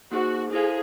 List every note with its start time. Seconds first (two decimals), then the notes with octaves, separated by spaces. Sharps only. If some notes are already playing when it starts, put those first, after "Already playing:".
0.12 A#3 D#4 F#4 G#4 C5
0.52 E4 G#4 A4 C5 F5